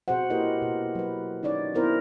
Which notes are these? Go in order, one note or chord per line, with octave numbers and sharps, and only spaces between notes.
B2 C4 F#4 G#4 C5 F#5
A#3 E4 G4 A#4 B4 D#5
B2
F#3 B4
C#4 D#4 C#5 D5
B3 C4 E4 A#4 C5